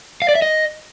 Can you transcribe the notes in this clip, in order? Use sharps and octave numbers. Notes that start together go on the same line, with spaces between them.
F5
D5
E5
D#5